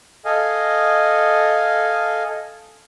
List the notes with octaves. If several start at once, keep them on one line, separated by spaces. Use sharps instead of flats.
A4 D#5 F5 G#5